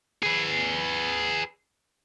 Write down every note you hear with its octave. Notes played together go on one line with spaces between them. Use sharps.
G#4 B4